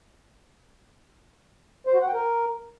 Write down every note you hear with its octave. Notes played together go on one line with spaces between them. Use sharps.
C5
F#4
F#5
G5
A#4